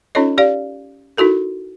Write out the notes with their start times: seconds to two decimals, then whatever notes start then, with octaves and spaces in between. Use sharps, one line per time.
0.15 C#4 D#4 F4 A4 C#5 D#5
0.38 G4 D5 F5
1.17 D#4 E4 F#4 A4 A#4